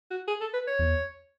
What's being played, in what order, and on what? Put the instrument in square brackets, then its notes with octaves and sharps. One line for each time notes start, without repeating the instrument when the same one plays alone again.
[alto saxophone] F#4
G#4
A4
B4
C#5
[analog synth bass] E2